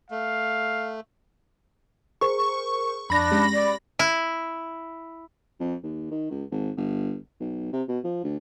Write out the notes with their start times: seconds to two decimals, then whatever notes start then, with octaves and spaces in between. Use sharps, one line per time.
0.10 A3 F5
2.21 G#4 A#4 C5 C#6
3.10 F2 D4 B5 A#6
3.31 G#3 C#4 G4
3.53 D5
3.99 E4
5.60 F2
5.83 D#2
6.11 D#3
6.31 C#2
6.51 G#1
6.77 G1
7.40 B1
7.73 C3
7.88 B2
8.04 F3
8.24 D2